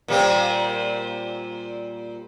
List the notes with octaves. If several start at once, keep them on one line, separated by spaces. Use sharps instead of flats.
A#2 G3 C4